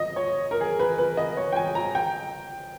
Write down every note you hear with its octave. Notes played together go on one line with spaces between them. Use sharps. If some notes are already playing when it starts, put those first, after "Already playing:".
Already playing: D#5
C#5
A#4
G#4
B4
B4
D#5
C#5
G5
G#5
A#5
G5